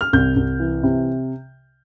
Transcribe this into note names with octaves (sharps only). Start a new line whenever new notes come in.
F6
C2 G6
C2
E3
C3